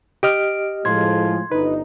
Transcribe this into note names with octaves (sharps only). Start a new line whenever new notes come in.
G4 D#5 F6 D7
A2 F3 G#3 C6 G#6
G1 D#4 B4